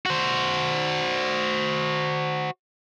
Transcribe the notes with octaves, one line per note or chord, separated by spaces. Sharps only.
F#4 C5